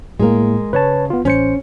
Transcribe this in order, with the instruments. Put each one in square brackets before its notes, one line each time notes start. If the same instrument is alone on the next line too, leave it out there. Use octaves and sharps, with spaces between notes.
[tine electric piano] A2 A#3 [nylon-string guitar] G#3 A#4
[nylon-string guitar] C#3 [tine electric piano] B4 C#5 A5
[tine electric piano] B3 F4
[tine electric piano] A1 C5 C#7 [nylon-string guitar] C#4